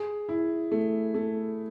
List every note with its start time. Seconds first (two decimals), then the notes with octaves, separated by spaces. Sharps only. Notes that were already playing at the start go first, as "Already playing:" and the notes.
Already playing: G#4
0.29 E4
0.72 A3
1.14 A3